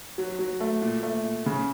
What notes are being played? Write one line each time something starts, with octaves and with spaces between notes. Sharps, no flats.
F#3
F#3
A3
A#2
A3
A#2
C#3